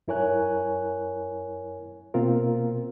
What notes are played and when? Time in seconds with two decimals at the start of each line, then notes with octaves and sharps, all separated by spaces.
0.08 F#2 E4 A#4 C#5 G#5 F#6
2.14 B2 A#3 C4 F4 A#4